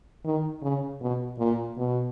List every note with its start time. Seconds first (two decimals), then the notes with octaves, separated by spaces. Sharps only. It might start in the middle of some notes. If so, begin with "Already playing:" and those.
0.25 D#3
0.63 C#3
1.01 B2
1.39 A#2
1.77 B2